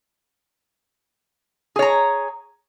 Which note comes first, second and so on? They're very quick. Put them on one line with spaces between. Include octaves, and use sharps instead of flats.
G#4 C#5 A#5